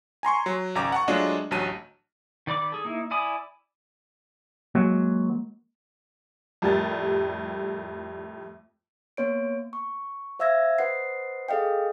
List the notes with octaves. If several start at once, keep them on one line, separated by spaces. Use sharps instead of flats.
G#5 A#5 C6 C#6
F#3
G#1 C#2 A#5 D6
F#5 A5 C#6
F#3 G#3 A3 D4 F4 D#5
A1 D2 F#3 A5 D#7
D#3 D5 B5 D6
G#4 A4
A#3 D#4 E4
E4 D5 G#5 B5 D#6
F#3 G#3 A#3
F2 A2 G3 G4 A#4 A6
A#3 B3 C#5 D7
C#6
C5 E5 F5 E6 G#6 A#6
B4 C5 D#5 F#5 C7
G#4 A4 D#5 F5 G5